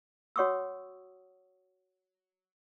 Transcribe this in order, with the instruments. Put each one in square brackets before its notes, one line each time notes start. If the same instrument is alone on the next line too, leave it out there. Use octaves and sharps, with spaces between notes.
[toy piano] F#4 C#5 F#5 C#6 D#6 E6